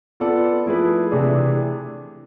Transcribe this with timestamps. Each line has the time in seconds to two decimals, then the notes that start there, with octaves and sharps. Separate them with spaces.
0.20 B3 F4 A4 D5
0.66 F3 A3 E4 G#4 B4
1.12 C3 E3 A3 D4 G#4